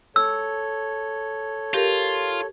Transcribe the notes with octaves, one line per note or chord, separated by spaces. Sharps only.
A4 C#5 E6
F4 G4 A#4